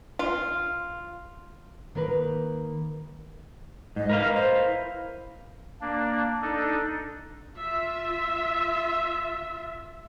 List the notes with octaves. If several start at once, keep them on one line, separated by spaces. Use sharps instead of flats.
F4
D#3 A#3 A#4 B4
G#2 D#5
A#4 B4 F5
C5
E4
A#3 D4
D4 D#4 A4
F4 E5